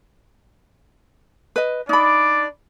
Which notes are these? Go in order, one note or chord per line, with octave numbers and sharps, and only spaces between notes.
B4 D#5
D4 D#4 D5 B5